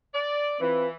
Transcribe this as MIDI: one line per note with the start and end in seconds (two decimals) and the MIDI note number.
0.14 0.60 74
0.61 0.95 52
0.61 0.88 60
0.61 0.88 65
0.61 0.88 71